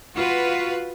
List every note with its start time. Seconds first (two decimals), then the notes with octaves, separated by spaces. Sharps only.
0.16 F4 F#4 B4